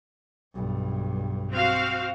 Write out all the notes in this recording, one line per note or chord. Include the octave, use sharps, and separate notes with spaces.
B1 G2
C4 F#4 F5